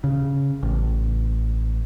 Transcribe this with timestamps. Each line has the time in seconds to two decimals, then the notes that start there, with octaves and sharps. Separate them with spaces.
0.04 C#3
0.63 A1